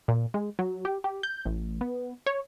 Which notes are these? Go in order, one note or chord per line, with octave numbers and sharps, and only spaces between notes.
A#2
G#3
F#3
G4
G4
G6
A1
B3
C#5